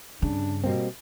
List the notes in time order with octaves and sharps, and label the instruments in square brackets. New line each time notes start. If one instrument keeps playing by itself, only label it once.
[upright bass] G2 C#3 [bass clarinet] D4
[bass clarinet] B2 [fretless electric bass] G3 A#3 C4